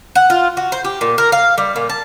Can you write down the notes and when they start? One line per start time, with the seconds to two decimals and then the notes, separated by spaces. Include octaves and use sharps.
0.15 F#5
0.30 F4
0.57 F#4
0.72 C5
0.85 G4
1.01 A#2
1.18 A#4
1.32 F5
1.58 G3
1.76 A#2
1.90 A5